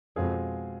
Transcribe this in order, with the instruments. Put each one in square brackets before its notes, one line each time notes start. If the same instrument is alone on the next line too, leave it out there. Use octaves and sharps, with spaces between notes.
[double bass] F2 [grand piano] B2 G#3 C4 F4 G#4